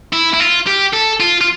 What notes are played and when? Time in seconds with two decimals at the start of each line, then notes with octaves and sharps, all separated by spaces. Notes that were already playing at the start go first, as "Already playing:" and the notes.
0.13 E4
0.33 E4
0.40 F4
0.67 G4
0.94 A4
1.20 F4
1.41 F4